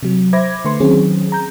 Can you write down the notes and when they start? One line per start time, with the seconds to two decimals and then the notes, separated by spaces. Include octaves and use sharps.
0.03 C3 F#3
0.33 C5 E5 B5 D6 G#6 A#6
0.65 D3 A3 B4 C6 C#6
0.80 D#3 F#3 C4 C#4 G#4
1.32 A#5 G6